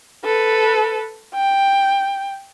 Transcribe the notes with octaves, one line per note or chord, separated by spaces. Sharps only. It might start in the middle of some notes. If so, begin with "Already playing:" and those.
A4 B4
G5